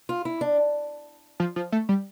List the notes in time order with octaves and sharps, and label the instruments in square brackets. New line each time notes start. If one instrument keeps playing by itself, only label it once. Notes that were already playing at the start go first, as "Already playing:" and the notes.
[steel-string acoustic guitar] F4
E4
D4
[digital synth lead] F3
F3
A3
G3